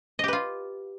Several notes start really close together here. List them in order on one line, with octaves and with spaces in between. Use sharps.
D#5 G4 B4 F4